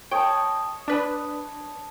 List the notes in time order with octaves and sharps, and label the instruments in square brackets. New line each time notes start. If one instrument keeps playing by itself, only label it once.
[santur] C#5 D#5 A5 [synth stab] G5
[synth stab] D4 B4